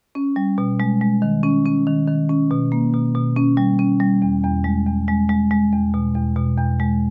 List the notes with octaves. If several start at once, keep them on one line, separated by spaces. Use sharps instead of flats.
C#4
G3
B2
G#3
G#3
D#3
C#4
C#4
D#3
D#3
C#4
B2
A#3
B2
B2
C#4
G3
C#4
G3
E2
E2
G#3
E2
G#3
G#3
G#3
E2
B2
E2
B2
E2
G#3